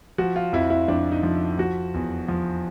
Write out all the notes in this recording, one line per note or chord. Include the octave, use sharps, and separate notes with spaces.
F3 F#4
F4
F2 E4
E4
F2 D4
D#4
F3
F3 F#4
E2
F3